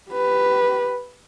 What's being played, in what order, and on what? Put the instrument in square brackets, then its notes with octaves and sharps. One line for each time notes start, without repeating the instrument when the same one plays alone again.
[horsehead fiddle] G4 B4